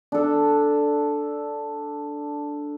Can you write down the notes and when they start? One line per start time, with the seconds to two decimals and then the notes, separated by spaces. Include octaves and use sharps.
0.12 D4 A4